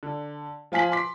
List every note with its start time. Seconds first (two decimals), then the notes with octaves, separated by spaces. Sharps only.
0.03 D3
0.72 F3 F4 G#5 B6 F#7
0.92 C6 D6 B6